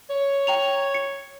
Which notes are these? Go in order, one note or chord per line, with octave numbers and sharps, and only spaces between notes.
C#5
G5 A#5 F7
C#7